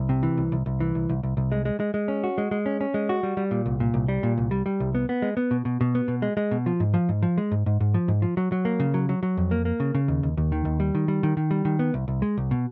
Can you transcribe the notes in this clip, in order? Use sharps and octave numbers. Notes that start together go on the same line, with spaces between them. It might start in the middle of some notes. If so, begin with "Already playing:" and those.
Already playing: C2
C3
E3
C2
C2
C2
E3
C2
C2
C2
C2
G#3
G#3
G#3
G#3
C#4
F#4
G#3
G#3
C#4
C#4
G#3
F#4
G3
G3
A#2
C2
A#2
C2
G3
A#2
C2
G3
G3
C2
B3
B3
G#3
B3
B2
B2
B2
B3
B2
G#3
G#3
B2
F3
G#2
F3
G#2
F3
G#3
G#2
G#2
G#2
F3
G#2
F3
F#3
F#3
A#3
C#3
F#3
F#3
F#3
F2
A#3
A#3
C#3
C#3
D#2
D#2
D#2
D#3
D#2
G3
D#3
G3
D#3
D#3
G3
D#3
B3
C2
C2
G#3
C2
B2